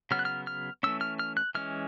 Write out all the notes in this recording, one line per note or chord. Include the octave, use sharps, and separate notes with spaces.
C#3 F#3 B3 F6
F#6
F6
F6
E3 A3 C#4 E6
F6
F6
F#6
E3 G#3 C#4 F6